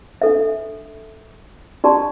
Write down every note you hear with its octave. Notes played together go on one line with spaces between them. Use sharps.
D4 A4 E5
D4 G4 D5 A5 C6